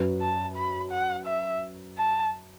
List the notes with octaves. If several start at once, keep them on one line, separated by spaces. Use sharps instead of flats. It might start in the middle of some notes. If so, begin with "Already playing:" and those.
Already playing: F#2 F#3 C#4 F#4 B4
A5
B5
F#5
E5
A5